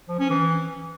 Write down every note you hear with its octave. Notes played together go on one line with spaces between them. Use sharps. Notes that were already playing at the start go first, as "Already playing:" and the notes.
F3
C#4
E3